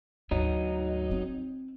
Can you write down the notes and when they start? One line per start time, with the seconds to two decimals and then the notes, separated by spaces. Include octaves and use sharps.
0.31 D2 G#2 F#3 D#4
1.11 C4